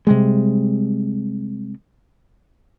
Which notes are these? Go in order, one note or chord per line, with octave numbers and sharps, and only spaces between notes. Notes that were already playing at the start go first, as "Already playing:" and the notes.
C3 G3 G#3